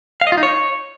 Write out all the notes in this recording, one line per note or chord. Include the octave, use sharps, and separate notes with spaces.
F5
D#5
F4
D#4
C#5